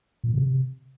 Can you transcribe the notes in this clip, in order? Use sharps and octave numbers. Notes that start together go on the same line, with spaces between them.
A#2
A2
C#3
C3